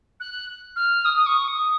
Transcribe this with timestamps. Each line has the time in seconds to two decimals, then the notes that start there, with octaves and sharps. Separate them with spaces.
0.20 F#6
0.76 F6
1.05 D#6
1.17 D#6
1.26 C#6
1.48 D#6